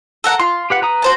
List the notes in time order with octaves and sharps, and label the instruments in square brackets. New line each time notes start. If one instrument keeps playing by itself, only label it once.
[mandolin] A4 A#4 F#5
[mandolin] F4 [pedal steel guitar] C6
[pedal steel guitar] G4 B4 F#5
B4 A#5 D#6
[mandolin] F#4 C5 A5